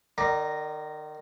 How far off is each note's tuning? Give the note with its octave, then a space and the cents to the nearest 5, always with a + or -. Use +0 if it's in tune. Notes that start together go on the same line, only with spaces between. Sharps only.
D#3 -30 D5 +0 A#5 +0